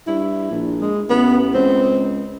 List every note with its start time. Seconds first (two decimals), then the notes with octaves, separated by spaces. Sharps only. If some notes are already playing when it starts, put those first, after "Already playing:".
0.07 G2 E4
0.51 A#1
0.81 G#3
1.10 A1 B3
1.54 C#2 C4